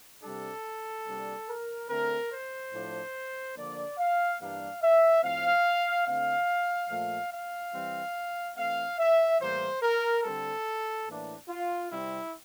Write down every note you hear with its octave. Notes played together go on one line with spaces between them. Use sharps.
C3 G3 D4 A4
C3 G3 A#3 D4
A#4
D3 A3 C4 A#4
C5
A2 F3 A3 D4
D3 F3 A#3 D4 D5
F5
G2 E3 G3 A#3 D4 F5
E5
A2 F3 C4 F5
D3 A3 C4 F5
A#2 F3 A3
F5
E3 G3 C4
E3 A3 C4 F5
E5
A2 E3 G3 A#3 C5
A#4
D3 G3 C4 A4
A2 E3 A#3 D4
F4
C3 G3 C4 E4